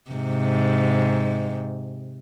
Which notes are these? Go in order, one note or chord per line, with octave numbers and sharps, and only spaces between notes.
G#2 C3